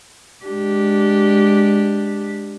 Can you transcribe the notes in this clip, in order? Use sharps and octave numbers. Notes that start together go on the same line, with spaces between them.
G#3 D4 G4